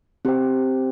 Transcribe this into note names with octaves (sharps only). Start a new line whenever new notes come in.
C4 G4 C5 G5